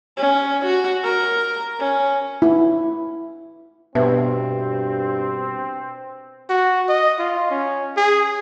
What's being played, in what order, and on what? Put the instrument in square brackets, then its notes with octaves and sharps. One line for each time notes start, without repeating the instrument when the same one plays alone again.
[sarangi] C#4
F#4
A#4
C#4
[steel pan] E4
[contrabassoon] G2 [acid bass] B2 [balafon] B3 B4 E5 [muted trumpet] C4
[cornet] F#4
D#5
F4
C#4
G#4